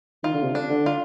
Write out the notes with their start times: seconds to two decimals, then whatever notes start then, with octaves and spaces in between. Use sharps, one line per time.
0.23 D#3 F4
0.34 D3
0.43 C3
0.54 D3 D4
0.70 D3
0.86 F4